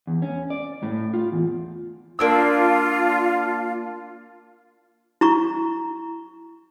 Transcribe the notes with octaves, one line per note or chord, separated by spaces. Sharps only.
E2
C#4
D5
A2
F4
E2
A#3 D4 F4 E6
E4 A#5 C#6